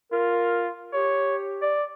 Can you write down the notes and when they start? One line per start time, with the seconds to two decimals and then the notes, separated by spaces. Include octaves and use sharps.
0.12 F4 A#4
0.93 G4 C#5
1.62 D5